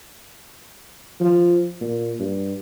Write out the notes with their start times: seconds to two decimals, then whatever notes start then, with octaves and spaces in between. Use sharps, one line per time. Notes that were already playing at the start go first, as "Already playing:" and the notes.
1.20 F3
1.81 A#2
2.19 G2